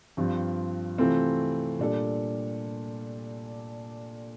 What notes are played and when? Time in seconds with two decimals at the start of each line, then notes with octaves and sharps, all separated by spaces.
0.17 G2 F3 C4 F4
0.98 C3 E3 A3 C4 F4
1.79 A#2 G3 D4 A4